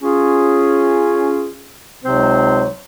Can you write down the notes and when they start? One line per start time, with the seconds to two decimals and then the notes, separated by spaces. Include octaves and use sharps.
0.02 C#4 F4 G#4
2.04 C#2 C3 F#3 C4 D#4 C5